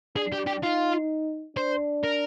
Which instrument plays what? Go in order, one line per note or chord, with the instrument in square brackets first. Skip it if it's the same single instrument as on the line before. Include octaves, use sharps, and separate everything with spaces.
[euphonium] D4 [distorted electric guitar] G#4
[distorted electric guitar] G4
G4
[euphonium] D#4 [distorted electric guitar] F4
[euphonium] D4 [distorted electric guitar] C5
[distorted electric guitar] A#4